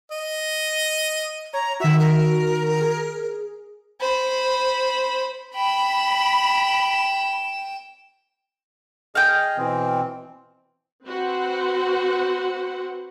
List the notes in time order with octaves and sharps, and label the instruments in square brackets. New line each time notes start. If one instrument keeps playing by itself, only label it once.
[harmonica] D#5
[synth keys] C#5 [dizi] A#5
[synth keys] D#3 F#4 [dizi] E5
[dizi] A#4
[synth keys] G#4
[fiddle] C5 B5
[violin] G5 E7 [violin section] B5
[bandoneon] G#4 D#5 [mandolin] F5 G5
[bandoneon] B2 E3 C4
[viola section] C4 F#4 B4 C5 F#5